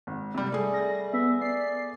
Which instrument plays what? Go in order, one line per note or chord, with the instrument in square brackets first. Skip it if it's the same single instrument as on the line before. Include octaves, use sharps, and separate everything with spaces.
[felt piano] G#1
C3 G3
[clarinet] G3 [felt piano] A3 G#4
[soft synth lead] A#6
[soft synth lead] B3 [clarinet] E5
[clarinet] D5 [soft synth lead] C7